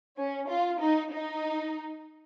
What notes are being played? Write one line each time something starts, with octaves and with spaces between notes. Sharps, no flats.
C#4
F4
D#4
D#4